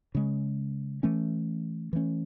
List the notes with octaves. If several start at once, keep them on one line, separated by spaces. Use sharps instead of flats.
C#3 G#3 C#4
E3 A3 C#4
E3 A3 C#4